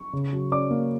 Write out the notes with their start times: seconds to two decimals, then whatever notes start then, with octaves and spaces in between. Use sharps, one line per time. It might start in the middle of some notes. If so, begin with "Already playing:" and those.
Already playing: C#6
0.13 C#3
0.33 F#3
0.52 C#4 D5 D6
0.71 A#3